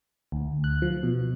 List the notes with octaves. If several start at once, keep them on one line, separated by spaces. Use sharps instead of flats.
D2
F#6
F3
B2